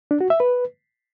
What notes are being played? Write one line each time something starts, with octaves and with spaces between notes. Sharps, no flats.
D4
F#4
E5
B4